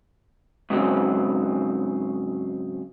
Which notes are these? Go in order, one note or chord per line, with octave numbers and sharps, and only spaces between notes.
G#2 C#3 F#3 C4